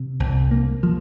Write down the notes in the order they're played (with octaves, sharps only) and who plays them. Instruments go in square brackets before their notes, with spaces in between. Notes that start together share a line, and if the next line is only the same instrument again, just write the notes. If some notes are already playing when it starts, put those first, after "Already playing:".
Already playing: [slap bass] C3
C2
A#3
F3